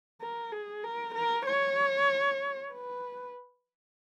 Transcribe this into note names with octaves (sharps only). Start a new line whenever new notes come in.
A#4
G#4
A#4
A#4
C#5
B4